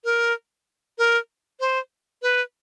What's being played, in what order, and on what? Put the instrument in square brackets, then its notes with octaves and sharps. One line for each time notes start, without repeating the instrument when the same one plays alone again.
[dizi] A#4
A#4
C5
B4